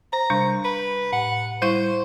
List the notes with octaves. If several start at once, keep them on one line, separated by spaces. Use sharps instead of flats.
C5 A#5
C3 G3 D4
B4
A2 F#5
G3 E4 C5 C#6